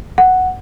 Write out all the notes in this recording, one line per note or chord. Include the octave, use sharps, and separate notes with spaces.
F#5